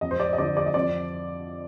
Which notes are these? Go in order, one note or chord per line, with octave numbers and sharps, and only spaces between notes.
F2 D#5
C5
D5
D#5
D3 F3 D5
D5
D#5
F2 D5